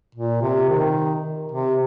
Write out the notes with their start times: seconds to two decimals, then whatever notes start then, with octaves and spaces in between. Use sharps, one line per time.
0.15 A#2
0.42 C3
0.69 D#3
1.52 C3